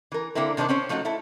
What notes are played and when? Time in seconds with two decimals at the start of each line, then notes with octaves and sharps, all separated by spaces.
0.12 E3 A#4
0.35 D3 A#3 C4 E4 A#4
0.57 C3 D#3 D4 F#4 C5
0.69 C4 C#4 C5 C#5
0.89 F3 A3 D#4 F4 F#4
1.05 E4 A4